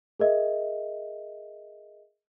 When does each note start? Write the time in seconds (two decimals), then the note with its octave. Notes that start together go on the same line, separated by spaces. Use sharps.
0.20 G#4 A#4 D#5 E5